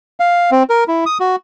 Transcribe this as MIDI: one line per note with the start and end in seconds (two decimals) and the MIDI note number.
0.20 0.50 77
0.51 0.63 60
0.70 0.84 70
0.88 1.04 64
1.06 1.18 87
1.20 1.36 66